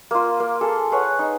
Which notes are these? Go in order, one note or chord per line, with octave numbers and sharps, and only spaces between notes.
A#3 F4
A#3
G#4 A4
G#4 B4 C#5 F#5
D#4